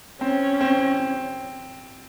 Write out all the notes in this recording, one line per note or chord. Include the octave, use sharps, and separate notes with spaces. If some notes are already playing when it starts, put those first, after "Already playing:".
C4 C#4
C4